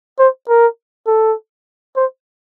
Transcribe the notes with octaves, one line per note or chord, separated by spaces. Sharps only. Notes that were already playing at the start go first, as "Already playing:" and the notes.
C5
A#4
A4
C5